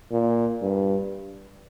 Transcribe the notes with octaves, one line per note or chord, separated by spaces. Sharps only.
A#2
G2